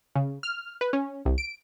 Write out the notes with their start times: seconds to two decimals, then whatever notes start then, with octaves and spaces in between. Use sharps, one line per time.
0.15 C#3
0.43 F6
0.81 B4
0.93 C#4
1.25 C2
1.38 D7